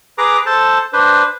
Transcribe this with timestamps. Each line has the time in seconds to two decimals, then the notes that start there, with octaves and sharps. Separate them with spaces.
0.18 G#4 B4 A#5 D6
0.46 A4 C5 A5
0.93 D4 B4 C5